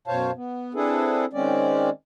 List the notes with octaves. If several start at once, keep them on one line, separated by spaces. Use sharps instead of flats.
F#2 B2 C5 C#5 F5 A5
B3
C4 D4 E4 G#4 A4 B4
D#3 G#3 C4 C#4 D5